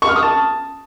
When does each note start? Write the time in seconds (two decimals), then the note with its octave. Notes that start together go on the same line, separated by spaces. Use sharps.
0.02 C#6
0.09 F6
0.16 D#6
0.23 A5